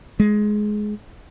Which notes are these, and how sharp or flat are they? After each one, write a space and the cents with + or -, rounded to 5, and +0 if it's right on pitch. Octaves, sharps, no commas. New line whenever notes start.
G#3 +15